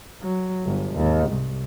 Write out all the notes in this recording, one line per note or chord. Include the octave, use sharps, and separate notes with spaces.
F#3
G1
D#2 G#2
C2